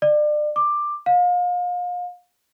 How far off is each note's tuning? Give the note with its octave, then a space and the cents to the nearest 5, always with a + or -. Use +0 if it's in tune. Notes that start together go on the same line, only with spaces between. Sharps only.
D5 +30
D6 +10
F5 +35